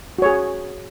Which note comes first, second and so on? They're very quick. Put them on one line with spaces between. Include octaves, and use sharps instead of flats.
F#4 C#5 G#4